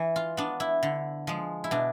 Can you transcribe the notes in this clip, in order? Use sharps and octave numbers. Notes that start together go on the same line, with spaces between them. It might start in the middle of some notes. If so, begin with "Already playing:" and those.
Already playing: E3
F4
B3 D4
E4
D3
F3 G#3
E4
B2 D4